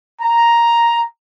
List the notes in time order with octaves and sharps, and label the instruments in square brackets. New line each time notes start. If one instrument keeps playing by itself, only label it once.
[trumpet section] A#5